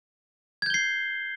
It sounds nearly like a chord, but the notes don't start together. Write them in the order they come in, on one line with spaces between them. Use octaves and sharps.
G#6 G6 G7 C7